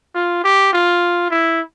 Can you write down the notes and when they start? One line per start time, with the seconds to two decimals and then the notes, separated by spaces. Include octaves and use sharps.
0.15 F4
0.44 G4
0.73 F4
1.30 E4